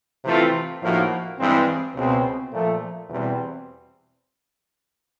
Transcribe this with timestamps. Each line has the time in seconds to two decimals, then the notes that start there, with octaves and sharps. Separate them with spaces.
0.24 C3 E3 A3 C4 F4
0.82 A2 F3 A#3 D#4 F#4
1.38 G2 E3 G#3 C4
1.95 C#2 B2 G#3 C4
2.52 A#2 F3 A3
3.10 E2 B2 G3 C4